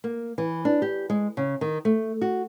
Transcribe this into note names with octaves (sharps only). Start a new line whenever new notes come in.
A#3
E3
D4
G4
G#3
C#3
D#3
A3
F#4